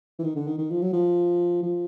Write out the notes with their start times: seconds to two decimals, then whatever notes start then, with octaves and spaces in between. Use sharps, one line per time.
0.19 E3
0.24 D#3
0.36 D3
0.48 D#3
0.58 D#3
0.70 F3
0.82 F#3
0.93 F3
1.63 F3